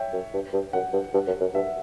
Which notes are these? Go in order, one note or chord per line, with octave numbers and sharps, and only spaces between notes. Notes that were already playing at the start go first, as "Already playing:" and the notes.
Already playing: C#5 E5 G5
F#2
G2
G2
F#2 F#5
G2
G2
F#2
F#2
G2 E5